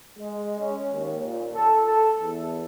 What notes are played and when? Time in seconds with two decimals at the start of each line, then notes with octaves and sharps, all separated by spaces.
0.18 G#3
0.59 C#4
0.93 D#2
1.25 A#2
1.54 A4
1.86 A4
2.20 E2